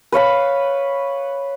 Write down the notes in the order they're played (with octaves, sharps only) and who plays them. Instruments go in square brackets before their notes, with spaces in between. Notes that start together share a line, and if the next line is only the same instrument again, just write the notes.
[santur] B4 C#5 F5 B5